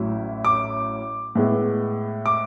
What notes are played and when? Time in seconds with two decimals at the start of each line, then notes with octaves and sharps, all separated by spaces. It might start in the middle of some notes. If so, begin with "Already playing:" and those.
Already playing: A1 A2 F#3 C#4 E4
0.45 D6
1.35 A2 G#3 B3 E4
2.26 D6